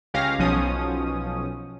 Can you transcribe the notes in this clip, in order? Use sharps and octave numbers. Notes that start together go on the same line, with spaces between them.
C#2 C#4 G4 F5 A#6
B1 B2 F3 C#4 D#6